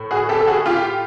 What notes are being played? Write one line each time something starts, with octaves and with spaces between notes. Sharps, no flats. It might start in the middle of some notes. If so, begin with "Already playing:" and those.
Already playing: A2
F#4 G#4
G4 A4
A4
F#4 G#4
F4 G4